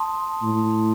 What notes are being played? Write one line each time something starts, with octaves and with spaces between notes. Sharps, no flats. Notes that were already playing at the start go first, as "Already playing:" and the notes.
Already playing: A5 C6 D#6
A2